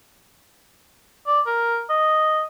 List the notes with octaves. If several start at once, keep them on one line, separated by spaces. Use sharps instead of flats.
D5
A#4
D#5